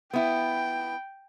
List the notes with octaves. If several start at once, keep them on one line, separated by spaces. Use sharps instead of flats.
B3 E4 G5